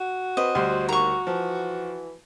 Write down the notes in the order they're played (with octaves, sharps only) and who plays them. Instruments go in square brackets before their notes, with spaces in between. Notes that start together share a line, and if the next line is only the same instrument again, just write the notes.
[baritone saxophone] F#4
[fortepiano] C4 [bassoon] B4 [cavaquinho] D#5
[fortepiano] D2 G3 C6 [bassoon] C5
[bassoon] D#2 [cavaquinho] A#5 C#6
[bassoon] E3 [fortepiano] F3